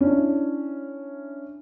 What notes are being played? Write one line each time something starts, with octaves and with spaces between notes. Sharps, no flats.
C#4 D4 E4